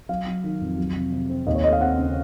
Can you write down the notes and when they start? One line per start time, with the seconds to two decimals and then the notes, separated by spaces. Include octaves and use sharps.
0.09 F#3 F5
0.26 F#3
0.44 D#3
0.61 F2
0.78 F#3
0.95 C3
1.12 C3
1.30 C4
1.47 D#2 D#5
1.55 C#5
1.64 A3 D#5
1.73 F5
1.81 C4 F#5
1.98 C#3